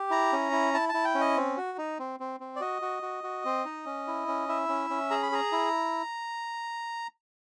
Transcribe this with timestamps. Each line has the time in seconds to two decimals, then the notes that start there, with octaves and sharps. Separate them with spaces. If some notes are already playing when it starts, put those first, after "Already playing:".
Already playing: G4
0.11 E4 A#5
0.33 C#4
0.52 E4
0.74 E4 A5
0.89 A5
0.94 E4
1.05 G5
1.15 C#4
1.21 D#5
1.37 C4
1.57 F#4
1.78 D#4
1.99 C4
2.20 C4
2.40 C4
2.56 D5
2.61 F#4 D#5
2.82 F#4
3.03 F#4
3.24 F#4
3.45 C4
3.65 D#4
3.86 C#4
4.07 E4
4.28 C#4
4.48 E4 E5
4.69 C#4
4.90 C#4
5.10 G#4 A#5
5.23 B5
5.32 G#4 A#5
5.52 E4